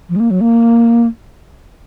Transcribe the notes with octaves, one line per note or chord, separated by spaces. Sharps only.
F3
G#3
A#3
F#3
A#3